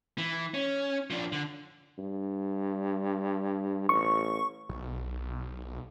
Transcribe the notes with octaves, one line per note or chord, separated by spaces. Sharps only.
E3
C#4
F3 D4
D3
G2
A1 C#6
B1